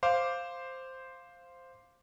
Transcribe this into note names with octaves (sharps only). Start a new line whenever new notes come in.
C5 F5 D6